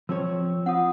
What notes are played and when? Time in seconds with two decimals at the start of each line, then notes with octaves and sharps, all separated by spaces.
0.09 F3 C4 C#5 E6
0.66 C4 F4 F#5 D#6